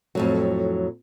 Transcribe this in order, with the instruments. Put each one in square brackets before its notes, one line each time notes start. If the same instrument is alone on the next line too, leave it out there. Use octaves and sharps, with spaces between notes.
[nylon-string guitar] F2 A2 F#3